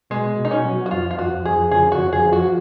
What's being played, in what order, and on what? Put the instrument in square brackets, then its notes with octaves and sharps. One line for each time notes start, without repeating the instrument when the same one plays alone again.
[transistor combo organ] B2 [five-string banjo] G#3
[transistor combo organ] B2
[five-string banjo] D#4
C#4
[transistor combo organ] F#3
[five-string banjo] F#4
[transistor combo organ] F2 [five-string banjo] F4
[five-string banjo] F4
[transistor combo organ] F2 [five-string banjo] F#4
[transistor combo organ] F2 [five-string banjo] G#4
[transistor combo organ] C#3 [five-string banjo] G#4
[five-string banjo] F#4
[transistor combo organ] F2
[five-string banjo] G#4
[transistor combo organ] F3
[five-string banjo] F#4